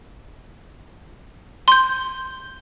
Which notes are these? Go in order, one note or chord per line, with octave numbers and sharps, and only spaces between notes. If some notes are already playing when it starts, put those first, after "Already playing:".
C6 G6